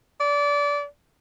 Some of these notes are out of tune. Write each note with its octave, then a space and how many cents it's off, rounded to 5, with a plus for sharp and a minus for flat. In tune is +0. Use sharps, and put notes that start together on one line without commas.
D5 -25